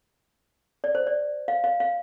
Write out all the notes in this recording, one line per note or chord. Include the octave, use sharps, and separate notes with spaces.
D5
C5
D5
F5
F5
F5